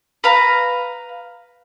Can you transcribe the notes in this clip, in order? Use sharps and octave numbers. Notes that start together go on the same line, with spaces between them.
B4 F5 A#5